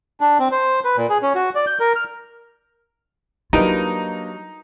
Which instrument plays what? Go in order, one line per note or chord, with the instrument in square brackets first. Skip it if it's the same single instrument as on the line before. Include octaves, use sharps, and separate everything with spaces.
[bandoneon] D4
C4
C5
B4
A#2
G#4
C#4
F#4
D5
G6
A#4
F6
[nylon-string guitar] F#3 G4 [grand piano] A#3 D4 B4 [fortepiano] D#4 [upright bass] F4